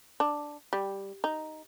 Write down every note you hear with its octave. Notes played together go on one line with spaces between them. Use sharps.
D4
G3
D#4